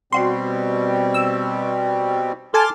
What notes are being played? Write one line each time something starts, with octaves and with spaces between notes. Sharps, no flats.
B2 G3 C4 F#4 C6
E6
A4 G#5 A5 C6 D6 F6